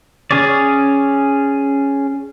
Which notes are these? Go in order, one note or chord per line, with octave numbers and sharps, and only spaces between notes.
C#4 G#4 C#5 D5